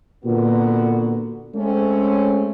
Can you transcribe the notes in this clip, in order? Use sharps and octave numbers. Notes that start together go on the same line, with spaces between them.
A#2 D3 B3 F#4
G#3 A3 C4 C#4